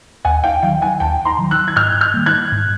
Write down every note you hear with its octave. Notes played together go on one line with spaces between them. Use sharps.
D#2 F#5 G#5
F5 G5
D#3 F#3 F5 G5
F#5 G#5
D#2 G5 A5
A#5 C6
D#3 F#3
E6 F#6
G#6
G#2 F6 G6
F6 G6
D#3 G3 A#3
F#6 G#6
G#2